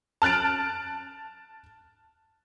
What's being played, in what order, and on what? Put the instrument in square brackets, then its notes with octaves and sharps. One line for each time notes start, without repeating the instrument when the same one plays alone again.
[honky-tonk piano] A5 F6 F#6 A6 D7